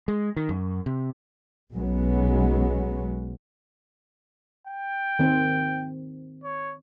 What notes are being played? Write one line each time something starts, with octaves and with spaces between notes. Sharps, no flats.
G#3
D#3
F#2
C3
B1 F#3 G#3 B3 C#4
G5
D#3 C4
C#5